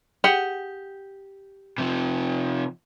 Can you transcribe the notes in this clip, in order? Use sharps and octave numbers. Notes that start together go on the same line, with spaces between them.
G4 G#4 F#5
C3 F3